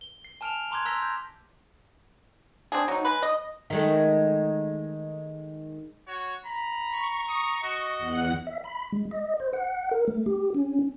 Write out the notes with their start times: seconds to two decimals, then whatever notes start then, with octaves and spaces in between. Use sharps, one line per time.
0.01 G7
0.25 C7
0.41 G#5 A5 F6 D7 E7 F7
0.71 A#5 C6 D6 F#6 G#6
0.85 A#5 C6 E6 F#6 A#6 B6
1.02 G6
2.72 C4 D4 G#4
2.88 F#3 D#4
3.05 G#3 B4
3.22 D#5
3.70 D#3 G#3 A3
6.07 F#4 C#5
6.45 A#5 B5
6.90 C#6
7.29 D#6
7.63 F#4 D#5
7.99 E2 F#5
8.47 E5
8.64 B5
8.92 G#3
9.11 D#5
9.40 C5
9.53 F#5
9.91 A#4
10.08 A3
10.26 G4
10.54 C#4